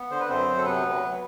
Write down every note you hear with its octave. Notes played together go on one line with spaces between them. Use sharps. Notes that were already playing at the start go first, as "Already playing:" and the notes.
Already playing: B3
D3 C5
B4
F#2 C4 C5
F#3
A4
C3 B3 B4
D2
F#3